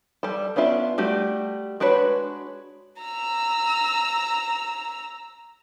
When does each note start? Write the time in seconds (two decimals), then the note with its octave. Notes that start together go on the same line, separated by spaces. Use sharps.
0.23 G3 A4
0.56 B3 C#4 D4 F4 E5
0.98 G3 A3 F#4 G4
1.80 G#3 D4 F#4 B4 C#5
3.02 A#5 E6